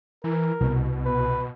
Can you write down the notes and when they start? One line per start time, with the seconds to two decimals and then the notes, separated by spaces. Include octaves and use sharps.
0.24 E3 A#4
0.61 C2 B2
1.05 B4